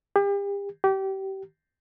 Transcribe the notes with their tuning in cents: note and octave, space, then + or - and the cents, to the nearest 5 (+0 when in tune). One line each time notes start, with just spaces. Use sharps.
G4 +35
G4 -30